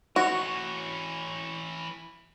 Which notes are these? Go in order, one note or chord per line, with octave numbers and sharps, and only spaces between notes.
E3 F#4 C#5